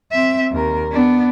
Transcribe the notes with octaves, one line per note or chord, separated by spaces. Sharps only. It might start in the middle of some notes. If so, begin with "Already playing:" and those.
C4 E5
D#2 A#4
B3 D4